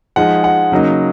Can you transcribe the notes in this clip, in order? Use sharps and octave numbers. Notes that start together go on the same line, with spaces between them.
F3 G#3 D#4 F#5
F#5
C#3 F#3 A#3 D#4